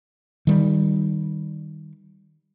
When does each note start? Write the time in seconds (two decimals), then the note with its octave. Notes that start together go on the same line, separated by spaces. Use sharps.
0.47 D#3 G3